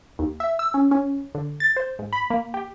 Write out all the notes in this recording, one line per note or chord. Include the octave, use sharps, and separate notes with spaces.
D#2
E5
E6
C#4
C#4
D3
A6
C5
G#2
B5
A#3
G4